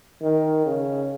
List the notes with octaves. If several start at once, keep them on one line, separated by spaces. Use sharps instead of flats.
D#3
C#3